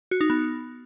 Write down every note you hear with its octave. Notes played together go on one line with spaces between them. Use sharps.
F#4
D#4
B3